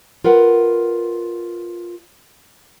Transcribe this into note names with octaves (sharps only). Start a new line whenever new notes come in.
F4 A#4 B4 F#5